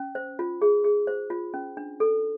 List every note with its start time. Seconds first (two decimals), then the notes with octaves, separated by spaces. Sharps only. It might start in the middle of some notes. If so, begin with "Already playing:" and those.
Already playing: C#4
0.15 C5
0.39 F4
0.62 G#4
0.84 G#4
1.07 C5
1.30 F4
1.54 C#4
1.77 D4
2.00 A4